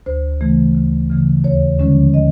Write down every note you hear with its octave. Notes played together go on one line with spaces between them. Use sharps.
D2 C5
C#3 E3 A3
D2
C#3 E3 A3
D#2 C#5
D3 F3 G#3 C#4
D#5